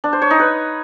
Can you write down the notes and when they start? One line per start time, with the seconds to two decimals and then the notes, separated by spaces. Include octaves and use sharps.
0.04 D4
0.13 C5
0.22 C#5
0.31 D#4
0.39 B4